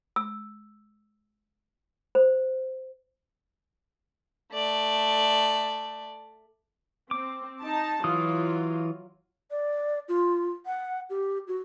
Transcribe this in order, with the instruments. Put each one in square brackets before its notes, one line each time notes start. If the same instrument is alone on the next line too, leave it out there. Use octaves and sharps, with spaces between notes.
[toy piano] E6
C5
[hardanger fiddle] A3 D5
[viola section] C4 [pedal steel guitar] D6
[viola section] D#4 A5
[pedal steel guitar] E3 D#6 [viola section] F#3 F4
[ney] D5
F4
F#5
G4
F#4